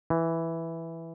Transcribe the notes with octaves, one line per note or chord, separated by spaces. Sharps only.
E3